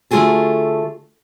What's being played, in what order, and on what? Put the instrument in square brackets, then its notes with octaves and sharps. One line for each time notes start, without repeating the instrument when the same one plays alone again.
[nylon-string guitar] D3 A3 F4 F#4 G#4 A4